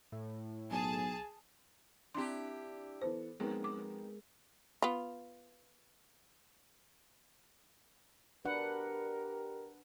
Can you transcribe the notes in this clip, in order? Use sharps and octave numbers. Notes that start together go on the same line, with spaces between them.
A2
B1 G#4 G#5 A5
C4 D4 E4 G4 C6
E3 B3 A4 C5
F2 G#3 B3 C4 D#4 G#4 A#4
D6
B3 F4
D4 G4 A#4 B4 F#5